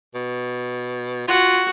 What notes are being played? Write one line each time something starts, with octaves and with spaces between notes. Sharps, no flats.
B2
F4 F#4